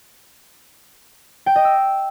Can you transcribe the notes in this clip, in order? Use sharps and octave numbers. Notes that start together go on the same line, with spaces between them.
G5
D#5
E6